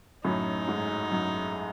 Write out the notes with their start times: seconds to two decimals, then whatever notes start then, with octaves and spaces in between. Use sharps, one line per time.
0.24 F#2 A2 D#4
0.68 G#2
1.11 F#2